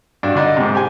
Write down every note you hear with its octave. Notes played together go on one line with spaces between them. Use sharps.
G2 D4 F#4
D3 D4 D#4 D#5
G#2 C3
G4 G#5